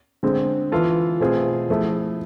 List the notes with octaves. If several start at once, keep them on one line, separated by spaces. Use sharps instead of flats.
D3 G#3 C4 G#4
E3 B3 F4 A4
B2 A3 C4 F4 G#4
F3 A3 E4 G#4